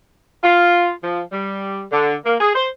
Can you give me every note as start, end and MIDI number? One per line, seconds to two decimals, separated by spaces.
0.43 0.91 65
1.03 1.21 53
1.31 1.85 55
1.91 2.15 50
2.25 2.35 58
2.40 2.53 68
2.55 2.68 72